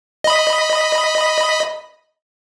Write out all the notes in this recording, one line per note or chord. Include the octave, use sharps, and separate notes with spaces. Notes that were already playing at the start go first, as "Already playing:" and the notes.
D#5 B5